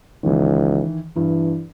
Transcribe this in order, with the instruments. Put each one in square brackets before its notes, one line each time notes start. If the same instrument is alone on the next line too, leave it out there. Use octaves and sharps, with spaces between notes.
[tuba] C#2 [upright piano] D#3 E3
[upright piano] G2 [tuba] E3